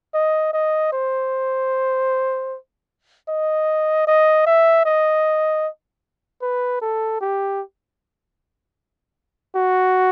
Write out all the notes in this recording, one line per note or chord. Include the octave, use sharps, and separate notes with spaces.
D#5
D#5
C5
D#5
D#5
E5
D#5
B4
A4
G4
F#4